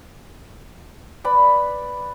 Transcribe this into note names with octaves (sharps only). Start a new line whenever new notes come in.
B4 D5 B5